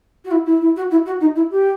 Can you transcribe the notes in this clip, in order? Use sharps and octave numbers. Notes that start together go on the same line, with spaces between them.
F#4
E4
E4
E4
F#4
E4
F#4
D#4
E4
G4